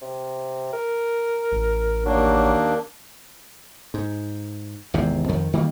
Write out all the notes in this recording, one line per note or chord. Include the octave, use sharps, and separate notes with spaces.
C3
A#4
A1
D#2 F#3 A#3 D4
G#2
G#1 E2 G#2 C3
F2 D#3
D#3 G3 A#3